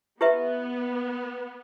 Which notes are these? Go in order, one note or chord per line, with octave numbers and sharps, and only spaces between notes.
B3 E4 G4 B4 E5